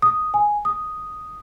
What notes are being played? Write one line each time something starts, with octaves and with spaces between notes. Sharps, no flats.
D#6
G#5
D#6